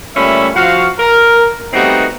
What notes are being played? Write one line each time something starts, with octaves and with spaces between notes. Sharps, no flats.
A#2 G3 A3 C#4 E5 B5
F3 F#4 F5
A#4
G3 A3 B3 C4 D#4 F#4